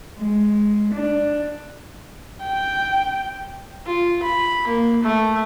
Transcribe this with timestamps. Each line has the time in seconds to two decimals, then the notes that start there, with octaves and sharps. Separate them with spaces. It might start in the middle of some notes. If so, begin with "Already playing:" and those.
0.18 G#3
0.94 D4
2.45 G5
3.86 F4
4.23 B5
4.67 A#3
5.03 A3